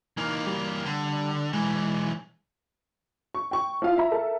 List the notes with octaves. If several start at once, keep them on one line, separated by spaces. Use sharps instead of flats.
E3 A#3 D#4
G3
D3
B1 E3 G#3
C#6
G5 C#6
F3 E4 F4 F5
E5 A#5
A4 A#4 E5 A5